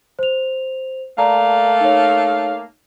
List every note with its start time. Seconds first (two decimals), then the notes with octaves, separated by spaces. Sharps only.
0.19 C5 F7
1.18 A3 A#3 D5 F5 A5 A#5
1.81 D#4 C#5